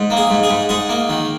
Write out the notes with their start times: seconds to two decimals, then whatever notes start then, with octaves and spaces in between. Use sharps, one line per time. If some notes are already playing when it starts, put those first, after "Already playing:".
Already playing: G#2
0.10 A#3
0.17 G#4
0.30 G#2
0.43 G#4
0.50 G#2
0.69 G#2 G#4
0.89 A#3
1.09 D#3